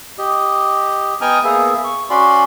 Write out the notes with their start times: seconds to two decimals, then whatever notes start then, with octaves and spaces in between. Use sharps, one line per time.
0.18 G4 D#5
1.21 B3 D#5 G5 G#5 A#5 F6
1.44 A#3 B3 G#4 E5
1.84 C#6
2.10 C#4 F#4 D5 B5 C6